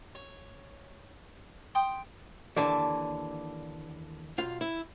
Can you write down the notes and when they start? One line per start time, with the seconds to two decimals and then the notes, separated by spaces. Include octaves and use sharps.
0.15 C#5
1.75 G5 C6 D#6
2.56 D#2 D3 E3 D5 A5
4.38 B1 F4 F5
4.61 E4